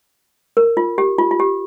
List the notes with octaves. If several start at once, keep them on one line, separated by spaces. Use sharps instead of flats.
A#4
F4
G4
F4
F4
G4